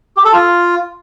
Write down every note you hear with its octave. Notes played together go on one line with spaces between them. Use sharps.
G4
A4
F4